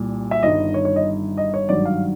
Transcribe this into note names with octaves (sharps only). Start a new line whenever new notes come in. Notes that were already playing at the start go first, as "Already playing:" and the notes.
Already playing: C2 A#2 G3
E5
G1 G2 D#3 D#5
C#5
C#5
D#5
D#5
C#5
G#1 G2 D#3 F#3 D5
F5